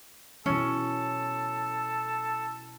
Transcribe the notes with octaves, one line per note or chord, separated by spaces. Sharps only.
B2 E3 C#4 A4